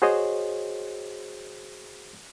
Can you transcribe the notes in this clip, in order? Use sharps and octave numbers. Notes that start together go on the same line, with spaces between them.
F#4 G#4 C5 C#5 D#5